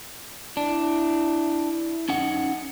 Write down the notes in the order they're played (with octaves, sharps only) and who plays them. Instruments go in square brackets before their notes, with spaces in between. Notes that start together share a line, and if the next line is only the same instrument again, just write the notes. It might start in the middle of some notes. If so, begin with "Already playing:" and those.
[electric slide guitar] D4 [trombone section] E4
[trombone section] F#2 [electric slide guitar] C#4 D#4 F#5